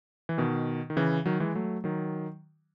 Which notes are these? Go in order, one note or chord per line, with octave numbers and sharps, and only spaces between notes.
E3
B2 D#3
D#3
C#3 E3
D#3 F#3
E3 G#3
F#3 A3
D#3 F#3